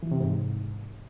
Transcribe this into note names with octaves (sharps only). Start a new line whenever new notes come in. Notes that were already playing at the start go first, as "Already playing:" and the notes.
E3
C3
G#2